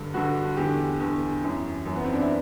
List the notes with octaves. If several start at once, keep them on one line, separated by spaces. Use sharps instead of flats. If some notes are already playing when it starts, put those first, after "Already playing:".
Already playing: G2 D3
G2 D3 F#4
E2 D3 G4
E2 D3
F#2 E3
F#2 E3
B3
C4
D4
E4